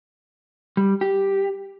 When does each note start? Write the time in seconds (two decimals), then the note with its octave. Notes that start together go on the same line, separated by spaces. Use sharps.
0.77 G3
1.01 G4